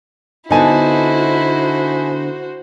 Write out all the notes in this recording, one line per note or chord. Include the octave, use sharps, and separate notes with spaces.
D3 B3 D#4 E4 F#4 C5 G#5 A5